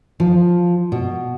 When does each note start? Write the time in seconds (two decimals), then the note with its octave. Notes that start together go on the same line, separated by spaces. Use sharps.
0.20 F3
0.92 B2